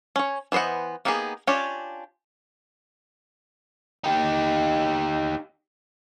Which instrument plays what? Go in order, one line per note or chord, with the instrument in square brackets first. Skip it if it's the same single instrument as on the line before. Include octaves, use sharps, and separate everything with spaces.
[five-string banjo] C#4 C#5
E3 B3 C5 D#5 F#5
A#3 B3 D#4 G4 G#4
C#4 D4 F4 G4 C#5
[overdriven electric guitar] D#4 G4